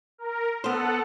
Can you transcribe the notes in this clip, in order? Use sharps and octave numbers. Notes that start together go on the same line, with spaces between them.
A#4
B3 A4 C5 F#5